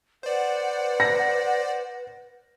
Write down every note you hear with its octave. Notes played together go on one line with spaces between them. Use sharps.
B4 C5 D5 F#5
A#6